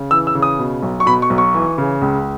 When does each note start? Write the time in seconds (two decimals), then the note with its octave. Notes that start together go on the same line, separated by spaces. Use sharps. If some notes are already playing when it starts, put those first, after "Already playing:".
Already playing: C#3
0.11 E3 E6
0.27 E6
0.35 C#3
0.42 D#6
0.59 B2
0.83 B1
1.00 C#6
1.06 B2 B5
1.22 C#6
1.30 B1
1.38 C#6
1.54 E3
1.78 C#3
2.01 C#2